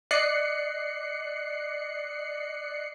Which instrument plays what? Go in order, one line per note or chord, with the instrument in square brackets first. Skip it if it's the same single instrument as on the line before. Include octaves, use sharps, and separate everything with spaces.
[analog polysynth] D5 D#5 F#6 C7 C#7